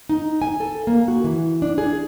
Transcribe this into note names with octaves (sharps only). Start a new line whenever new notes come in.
D#4
G#5
A4
A#3
F#4
E3
D4
G#4